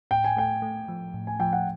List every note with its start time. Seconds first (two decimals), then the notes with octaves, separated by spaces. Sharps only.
0.11 A2 G5
0.24 G#5
0.37 A3 G5
0.62 A3
0.88 F3
1.14 A2
1.27 G#5
1.40 F3 G5
1.53 F#5